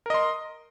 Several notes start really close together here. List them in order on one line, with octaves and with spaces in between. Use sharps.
A#4 D#5 C6